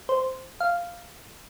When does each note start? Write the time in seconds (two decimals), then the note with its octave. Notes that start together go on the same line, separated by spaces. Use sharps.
0.09 C5
0.60 F5